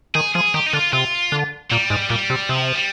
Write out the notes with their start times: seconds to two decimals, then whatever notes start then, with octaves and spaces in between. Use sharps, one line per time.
0.15 D#3 G#4
0.35 F3 G#4
0.54 D#3 G4
0.67 D#4
0.73 D3 F4
0.93 C3 F4
1.32 D3
1.71 A#2 G3
1.90 G#2
2.10 A#2 G3
2.30 C3
2.49 C3 F3
2.75 G3